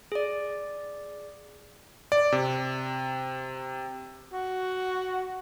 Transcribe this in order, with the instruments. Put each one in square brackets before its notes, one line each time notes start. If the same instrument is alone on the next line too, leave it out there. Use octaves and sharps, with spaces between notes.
[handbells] G#4 D5
[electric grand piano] D5
C3
[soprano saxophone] F#4